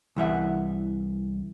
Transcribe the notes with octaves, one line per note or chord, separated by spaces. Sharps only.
C2 E3 E5 F#5